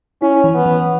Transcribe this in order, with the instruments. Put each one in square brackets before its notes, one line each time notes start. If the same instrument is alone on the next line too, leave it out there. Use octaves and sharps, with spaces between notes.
[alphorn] C#4 [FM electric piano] E4
[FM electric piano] E3
[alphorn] B3
[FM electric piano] E3